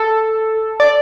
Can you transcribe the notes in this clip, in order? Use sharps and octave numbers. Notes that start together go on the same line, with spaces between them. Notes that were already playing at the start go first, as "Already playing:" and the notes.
Already playing: A4
D5